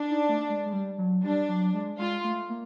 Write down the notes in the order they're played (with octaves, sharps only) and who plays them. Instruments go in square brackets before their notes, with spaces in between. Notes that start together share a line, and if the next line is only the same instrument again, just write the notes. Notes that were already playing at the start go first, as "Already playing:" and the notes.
Already playing: [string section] D4
[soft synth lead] D#4
A3
G#3
G#3
G3
F#3
[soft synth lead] G3 [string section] D4
[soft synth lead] F#3
G#3
[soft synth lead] G#3 [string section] F4
[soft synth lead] A3
A#3